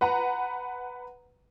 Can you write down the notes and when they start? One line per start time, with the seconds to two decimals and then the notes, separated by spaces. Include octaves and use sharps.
0.01 B4 F#5 A#5